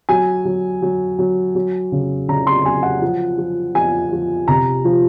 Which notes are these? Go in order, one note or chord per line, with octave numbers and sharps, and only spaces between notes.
F#3 G#5
F#3
F#3
F#3
F#3
C#3
C#3 A#5
C6
F#3 G#5
F#5
F3
F3
F3 G#5
F3
C3 A#5
F3